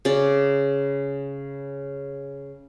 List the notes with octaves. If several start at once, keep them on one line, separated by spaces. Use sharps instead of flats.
C#3 D5